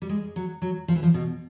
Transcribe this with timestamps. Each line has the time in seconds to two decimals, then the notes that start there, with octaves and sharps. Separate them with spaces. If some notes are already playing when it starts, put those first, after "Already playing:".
0.02 G3
0.09 G#3
0.36 F#3
0.62 F#3
0.88 F3
0.96 E3
1.03 F3
1.14 B2